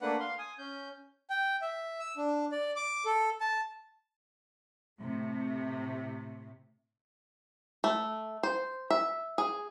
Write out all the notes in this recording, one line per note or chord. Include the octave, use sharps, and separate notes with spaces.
A3 A#3 D4 B4 F#5
F5 C6
G#5 D#6
C#4 G6
G5
E5
E6
D4
D5
D6
A4
A5
A2 C3 A3
A3
C5
E5
G#4